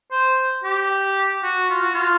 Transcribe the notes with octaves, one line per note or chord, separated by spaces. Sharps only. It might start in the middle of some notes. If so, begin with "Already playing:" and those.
C5
G4
F#4
F4
F#4
F4